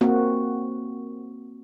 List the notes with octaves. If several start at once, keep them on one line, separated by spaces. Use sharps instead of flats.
A#3 C4 F#4